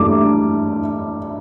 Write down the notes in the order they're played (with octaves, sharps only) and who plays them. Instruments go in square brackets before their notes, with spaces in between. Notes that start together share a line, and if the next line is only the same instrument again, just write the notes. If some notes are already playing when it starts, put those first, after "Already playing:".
Already playing: [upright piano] G2 A3 D6